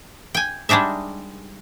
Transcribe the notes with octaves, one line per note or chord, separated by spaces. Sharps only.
G5 G#5
G3 G#3 D4 D#4 E5